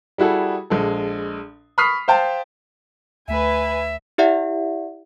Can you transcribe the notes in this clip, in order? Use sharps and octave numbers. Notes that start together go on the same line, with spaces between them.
G3 E4 F#4 G#4 A4
A#1 G#3 A4
B5 C#6 D#6 F6 B6 C7
C5 F5 G5 A5
D2 A3 B4 E5 G#5
E4 G4 D5 E5 F#5